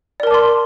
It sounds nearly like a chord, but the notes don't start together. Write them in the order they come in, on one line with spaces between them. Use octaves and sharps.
D5 A#4 A5 D6 C6